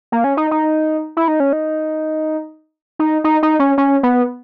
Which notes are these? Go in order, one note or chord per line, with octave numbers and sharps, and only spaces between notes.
A#3
C#4
D#4
D#4
E4
D#4
C#4
D#4
D#4
D#4
D#4
C#4
C#4
B3